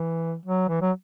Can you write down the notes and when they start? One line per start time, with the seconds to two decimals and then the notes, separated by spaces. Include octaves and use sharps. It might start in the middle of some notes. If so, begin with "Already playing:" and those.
Already playing: E3
0.46 F#3
0.69 E3
0.82 F#3